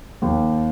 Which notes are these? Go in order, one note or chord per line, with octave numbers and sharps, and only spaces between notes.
D#2